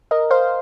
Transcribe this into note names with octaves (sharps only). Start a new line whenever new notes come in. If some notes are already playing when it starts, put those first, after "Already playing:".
A#4 D#5
C5 F5